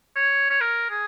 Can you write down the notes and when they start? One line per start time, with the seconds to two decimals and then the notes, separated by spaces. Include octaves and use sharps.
0.16 C#5
0.50 C#5
0.61 A#4
0.90 G#4